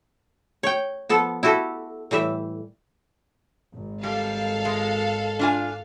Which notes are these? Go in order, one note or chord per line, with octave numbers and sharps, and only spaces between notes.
C#5 G5
F3 B3 A4
E4 F#4 G4 A4
A2 E3 G3 E5
G#1
G3 A4 F5
G#3
D4 F4 G#5